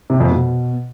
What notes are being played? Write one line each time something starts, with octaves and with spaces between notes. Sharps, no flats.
C3
F2
B2